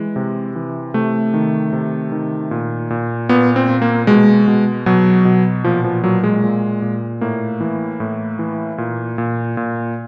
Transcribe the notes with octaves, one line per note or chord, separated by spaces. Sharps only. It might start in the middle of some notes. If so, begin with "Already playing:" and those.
Already playing: E3 G#3
C3
E3
C3 A3
D#3
C3
D#3
A#2
A#2
A#2 B3
C4
A#2
A#3
B2 G#3
B2
B2 F#3
B2
A#2 F3
F3
A#2 F#3
G#3
A#2
A#2
A2 A#3
E3
A2
E3
A#2
A#2
A#2